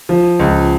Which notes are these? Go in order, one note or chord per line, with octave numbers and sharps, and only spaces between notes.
F3
C#2